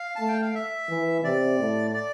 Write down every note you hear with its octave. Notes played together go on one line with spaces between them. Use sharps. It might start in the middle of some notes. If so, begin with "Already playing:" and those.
Already playing: F5
A3 A5
G5
F5
E5
E3
C3 D5
A2
D5